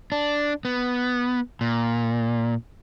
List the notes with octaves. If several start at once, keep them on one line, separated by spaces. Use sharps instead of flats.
D4
B3
A#2